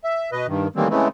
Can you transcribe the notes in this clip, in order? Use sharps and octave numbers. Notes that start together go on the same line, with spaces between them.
E5
B2 B4 D#5
G2 D#3
A2 D#3 E3 G3 A#3 C4
C#3 E3 G#3 A3 B3 C4